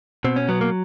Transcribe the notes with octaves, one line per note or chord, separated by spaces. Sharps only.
B2 C4
C#4
F#3 B3
A#3